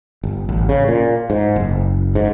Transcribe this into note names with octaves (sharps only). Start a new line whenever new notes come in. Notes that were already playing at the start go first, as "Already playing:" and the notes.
G1
A1
C#3
A#2
G#2
F#1
G#2